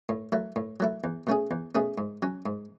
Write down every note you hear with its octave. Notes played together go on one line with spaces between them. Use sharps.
A2
F#3 A3 E4
A2
F#3 A3 E4
E2
B2 A3 C#4 G#4
E2
B2 A3 C#4 G#4
G#2
F#3 C#4
G#2